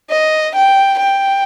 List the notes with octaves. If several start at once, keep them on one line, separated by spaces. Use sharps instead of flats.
D#5
G5
G5